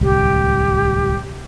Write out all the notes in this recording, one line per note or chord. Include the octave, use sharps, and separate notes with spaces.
D1 C2 G4